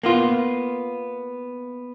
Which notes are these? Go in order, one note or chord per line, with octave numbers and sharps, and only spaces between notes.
A#3 B3 F4